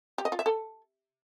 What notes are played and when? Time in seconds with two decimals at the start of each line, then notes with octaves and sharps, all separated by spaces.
0.18 G4
0.25 D#5
0.32 F4
0.39 E5
0.46 A4